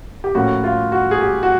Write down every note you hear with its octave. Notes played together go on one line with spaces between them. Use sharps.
G4
A2 F3 A#3 C#4 F#4
F4
F#4
G#4
G4
F#4